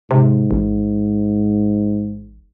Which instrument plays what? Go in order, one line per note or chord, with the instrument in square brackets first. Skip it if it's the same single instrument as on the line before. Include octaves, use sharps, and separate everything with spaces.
[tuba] G#2 [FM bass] C3
[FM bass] A1